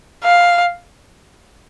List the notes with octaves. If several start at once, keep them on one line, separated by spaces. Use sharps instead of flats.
F5